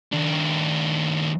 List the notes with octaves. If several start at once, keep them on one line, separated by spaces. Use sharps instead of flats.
D#2 D4